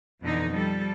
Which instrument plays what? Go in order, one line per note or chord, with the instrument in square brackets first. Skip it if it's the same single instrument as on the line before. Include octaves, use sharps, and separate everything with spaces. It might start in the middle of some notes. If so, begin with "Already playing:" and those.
[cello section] F2 B2 D3 E3 D#4
F3 G3 A4